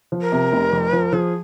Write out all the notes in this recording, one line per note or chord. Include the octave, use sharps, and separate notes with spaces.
F3
A#4
C3
F1
F2
F3
F3 G#4